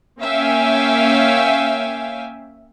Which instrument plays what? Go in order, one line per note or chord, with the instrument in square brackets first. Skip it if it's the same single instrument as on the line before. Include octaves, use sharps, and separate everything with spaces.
[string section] A#3 C#4 E5 F5 G5 G#5